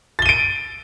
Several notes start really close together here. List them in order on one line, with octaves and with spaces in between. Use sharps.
A6 G7 D#7 D7